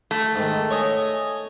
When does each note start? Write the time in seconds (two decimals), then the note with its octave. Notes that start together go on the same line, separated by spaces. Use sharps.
0.11 A3
0.35 G#2 D#3
0.71 C#5 D#5 G#5